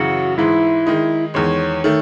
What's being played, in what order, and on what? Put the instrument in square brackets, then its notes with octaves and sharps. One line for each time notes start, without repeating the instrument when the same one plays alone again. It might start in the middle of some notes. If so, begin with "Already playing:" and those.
Already playing: [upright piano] F#2 C#3 E3 [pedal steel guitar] F#4
[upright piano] G#2 E3 G#3 [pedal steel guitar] E4
[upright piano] D#3 G#3 D#4
[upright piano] E2 D#3 G#3 [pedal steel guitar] C#5
[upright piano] D#3 A3